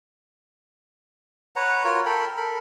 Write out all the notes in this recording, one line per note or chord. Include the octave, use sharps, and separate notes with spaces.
B4 C#5 F#5 A#5
F4 F#4 A#4 C#5
A4 A#4 G5 B5
A4 A#4 B5